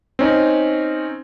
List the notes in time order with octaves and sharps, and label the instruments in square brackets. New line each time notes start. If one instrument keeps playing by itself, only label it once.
[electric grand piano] C4 C#4 D#4